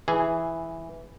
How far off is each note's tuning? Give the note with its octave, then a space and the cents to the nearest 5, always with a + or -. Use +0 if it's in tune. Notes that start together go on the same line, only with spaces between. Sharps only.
E3 +0 G#4 +0